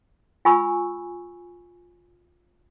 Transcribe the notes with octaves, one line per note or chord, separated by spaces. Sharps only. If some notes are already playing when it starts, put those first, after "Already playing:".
F4 G#5 B5 C#6 E6